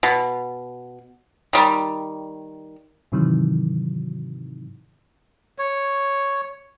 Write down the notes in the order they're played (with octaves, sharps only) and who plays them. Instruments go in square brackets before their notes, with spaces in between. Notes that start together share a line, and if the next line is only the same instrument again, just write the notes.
[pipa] B2
D#3 G3
[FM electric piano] G#2 C3 D#3 E3 F#3
[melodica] C#5